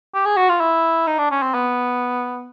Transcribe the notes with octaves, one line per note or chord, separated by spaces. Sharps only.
G4
G#4
F#4
F4
E4
D#4
D4
C#4
C4
B3